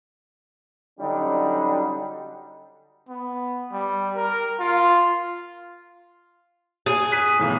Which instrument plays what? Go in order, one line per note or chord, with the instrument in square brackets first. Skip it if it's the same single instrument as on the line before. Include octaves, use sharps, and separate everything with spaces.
[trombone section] D3 F#3 G3 C#4 D#4
[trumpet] B3
G3
A#4
F4
[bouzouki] G#4
[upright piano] F#6 B6 D#7
B1 E2 A2